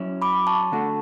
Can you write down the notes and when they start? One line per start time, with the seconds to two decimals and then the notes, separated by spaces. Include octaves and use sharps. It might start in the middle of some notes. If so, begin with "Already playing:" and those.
Already playing: F#3 C#4 E4
0.22 B5 D6
0.47 A5 C#6
0.72 D3 A3 D4 F#4